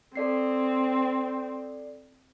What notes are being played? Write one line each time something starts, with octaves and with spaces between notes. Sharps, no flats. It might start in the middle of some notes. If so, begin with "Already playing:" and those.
C4 A4 D5 C7